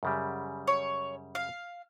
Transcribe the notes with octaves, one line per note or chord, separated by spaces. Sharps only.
F#2 C#3 G3
C#5
F5